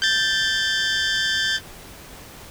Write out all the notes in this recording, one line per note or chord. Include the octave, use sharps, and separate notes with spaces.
G6 A6